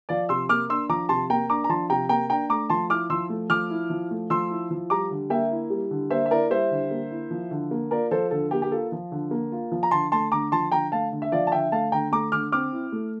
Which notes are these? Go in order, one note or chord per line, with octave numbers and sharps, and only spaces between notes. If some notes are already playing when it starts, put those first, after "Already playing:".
F3 D5 F5
C3 C6 E6
A#3 D6 F6
D4 C6 E6
F3 A#5 D6
C3 A5 C6
A#3 G5 A#5
D4 A#5 D6
A#5
F3 A5 C6
C3 G5 A#5
A#3 G5 A#5
D4 G5 A#5
A3 A#5 D6
F3 A5 C6
E4 D6 F6
F3 C6 E6
A3
F3 D6 F6
E4
F3
A3
F3 C6 E6
E4
F3
G3 A#5 D6
D3
A#3 E5 G5
E4
G3
D3
A#3 C5 E5
E5
E4 A#4 D5
G3 C5 E5
D3
A#3
E4
F3
D3
A#3
F4 A#4 D5
F3 A4 C5
D3 A4
A#3 G4
G4
F4 A4
F3
D3
A#3
F4
F3
A#5
D3 A5 C6
A3 A5 C6
D3 A#5 D6
F3 A5 C6
D3 G5 A#5
A3 F5 A5
D3
E5
F3 D5 F5
A5
D3 E5 G5
A3 F5 A5
D3 G5 A#5
A3 A#5 D6
D3 D6 F6
C4 D6 F6
E4
A3